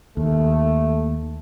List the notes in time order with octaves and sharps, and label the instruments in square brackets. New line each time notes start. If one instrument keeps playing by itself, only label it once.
[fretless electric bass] D#2 [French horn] A3